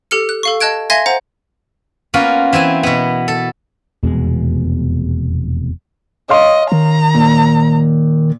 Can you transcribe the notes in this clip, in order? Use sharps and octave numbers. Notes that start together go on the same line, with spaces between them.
G4 A4 F6 C#7
F#6
A4 F5 C#6
D#5 A5 F#6 G#6 D7
E5 F5 G#5 C6 G#6 A#6
C5 F#5 A#5
A#3 B3 C#4 F4 F#4
E3 C4 E4 G#5
B2 B3
A4
F1 E2 B2 G#3
C#5 D#5 F5 C6
D#3 A#5
A#2